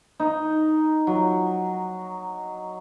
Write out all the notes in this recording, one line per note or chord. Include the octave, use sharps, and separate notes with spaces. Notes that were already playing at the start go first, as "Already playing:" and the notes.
D#4
F#3